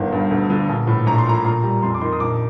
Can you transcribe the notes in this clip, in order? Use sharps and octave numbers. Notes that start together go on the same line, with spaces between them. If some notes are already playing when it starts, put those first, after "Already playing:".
Already playing: G1 D#3 F5
G2
D2
D3
A#1
A2
A#1 A#5
C6
A#2 A#5
A#2 A#5
G3
F2 C6
D6
D#3 C6
D#6
A#1 D6